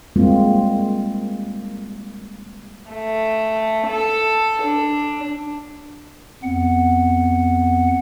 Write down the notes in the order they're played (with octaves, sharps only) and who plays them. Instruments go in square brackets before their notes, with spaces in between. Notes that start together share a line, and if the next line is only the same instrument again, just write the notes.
[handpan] G3 G#3 A#3 C4 F4
[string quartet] A3
A4
D4
[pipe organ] F2 B3 F#5